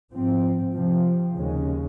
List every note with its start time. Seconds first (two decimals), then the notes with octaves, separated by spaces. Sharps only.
0.13 G#2 F3 C4
0.75 C3 F3 C4
1.37 D#2 C#3 G#3 C#4